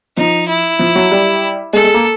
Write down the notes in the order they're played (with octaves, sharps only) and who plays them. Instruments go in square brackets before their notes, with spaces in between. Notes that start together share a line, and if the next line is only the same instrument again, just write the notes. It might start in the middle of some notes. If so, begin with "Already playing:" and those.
[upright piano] F3 [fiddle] D#4
[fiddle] E4
[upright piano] F3
F#3
G3
[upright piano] G#3 [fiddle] A4
[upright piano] G#3
A#3